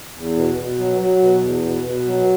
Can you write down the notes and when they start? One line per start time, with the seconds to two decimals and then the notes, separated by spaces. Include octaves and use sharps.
0.15 E2
0.36 B2
0.58 B2
0.79 F#3
1.01 F#3
1.22 B2
1.43 E2
1.64 B2
1.85 B2
2.07 F#3